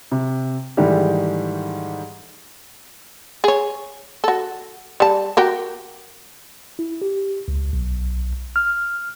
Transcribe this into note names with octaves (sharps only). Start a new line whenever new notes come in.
C3
G#2 D#3 E3 G3 A3 G4
G#4 C#5
F#4 A4
G3 A5
F#4 G4 A#4
E4
G4
C#2
B1
F6